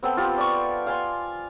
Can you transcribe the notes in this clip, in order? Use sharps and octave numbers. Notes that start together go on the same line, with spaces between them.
B3 C4 A4 G5
F4 G4
D5 C#6
F5 G#5 C6